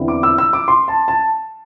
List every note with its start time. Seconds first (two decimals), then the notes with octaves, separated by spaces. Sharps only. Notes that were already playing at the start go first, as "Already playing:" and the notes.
Already playing: E2 D3 C4 E4
0.08 D6
0.23 E6
0.38 E6
0.53 D6
0.68 C6
0.88 A5
1.08 A5